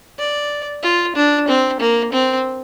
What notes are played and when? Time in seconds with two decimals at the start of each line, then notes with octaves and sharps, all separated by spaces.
0.19 D5
0.83 F4
1.16 D4
1.48 C4
1.80 A#3
2.12 C4